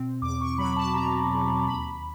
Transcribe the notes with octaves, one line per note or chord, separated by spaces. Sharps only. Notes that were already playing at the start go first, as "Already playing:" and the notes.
Already playing: B2 C4
E2 D6
C#6
F#3 B5
A5
B2 A#5
E2
D#2 B5